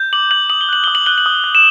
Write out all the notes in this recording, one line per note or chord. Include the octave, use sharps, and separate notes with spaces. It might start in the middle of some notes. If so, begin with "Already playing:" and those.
Already playing: G6
D6 F#7
G6 F#7
D#6 F#7
G7
F#6 F#7
D#6 G7
F#7
F#6 G7
F#7
D#6
F#6
E7